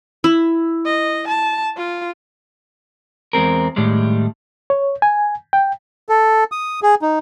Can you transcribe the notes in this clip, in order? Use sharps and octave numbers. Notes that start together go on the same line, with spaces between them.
E4
D#5
A5
F4
E2 G#3 C4 A#4
A2 D#3 G3 G#3
C#5
G#5
G5
A4
D#6
G#4
D#4